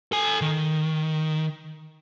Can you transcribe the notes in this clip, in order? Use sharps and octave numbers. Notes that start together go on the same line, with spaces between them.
A4 G#5
D#3